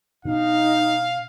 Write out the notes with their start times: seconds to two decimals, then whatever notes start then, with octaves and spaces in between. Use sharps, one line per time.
0.25 B2 D4 D#4 F5